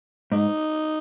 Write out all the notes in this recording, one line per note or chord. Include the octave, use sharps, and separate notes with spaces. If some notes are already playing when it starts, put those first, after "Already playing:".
G#2 D#4